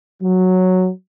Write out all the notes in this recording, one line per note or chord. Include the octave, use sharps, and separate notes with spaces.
F#3